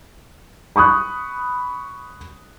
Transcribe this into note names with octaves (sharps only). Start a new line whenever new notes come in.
B5 C#6 D#6 F#6